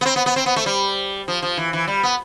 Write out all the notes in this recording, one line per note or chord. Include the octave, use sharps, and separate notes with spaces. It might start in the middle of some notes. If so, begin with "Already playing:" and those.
B3
C4
B3
B3
C4
B3
A3
G3
F3
F3
E3
E3
G3
B3